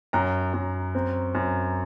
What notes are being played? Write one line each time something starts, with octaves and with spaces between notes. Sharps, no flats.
F#2 A#5
F#2
C4
F#2